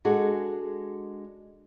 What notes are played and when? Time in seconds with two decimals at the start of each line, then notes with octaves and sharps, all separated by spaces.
0.05 G#3 D4 F#4 G#4 A4